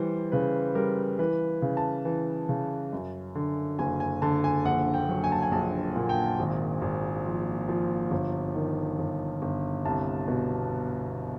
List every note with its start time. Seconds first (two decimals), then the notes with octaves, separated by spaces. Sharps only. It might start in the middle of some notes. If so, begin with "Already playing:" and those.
Already playing: E3 G3 C5
0.32 C#3 B4
0.75 G3 A#4
1.19 E3 B4
1.62 C#3
1.77 A5
2.05 E3
2.49 C#3
2.93 F#2
3.35 D3
3.79 F#1 G#5
4.00 G#5
4.22 D3 A5
4.44 G#5
4.65 A#1 F#5
4.94 G5
5.09 F#3
5.24 G#5
5.32 A5
5.42 G#5
5.51 A#1 A5
5.96 A#2
6.09 G5
6.39 G#1
6.81 G#1
7.26 F3
7.69 F3
8.11 G1
8.55 D#3
8.99 G1
9.42 G1
9.85 C2 A5
10.28 B2